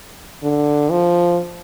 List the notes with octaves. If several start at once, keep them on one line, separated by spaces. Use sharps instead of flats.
D3
F3